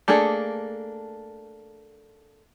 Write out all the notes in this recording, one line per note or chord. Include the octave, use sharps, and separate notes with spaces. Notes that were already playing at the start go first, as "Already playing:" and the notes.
A3 A#3 D4 G#4 A4